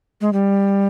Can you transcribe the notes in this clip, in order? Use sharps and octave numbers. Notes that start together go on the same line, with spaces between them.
G#3
G3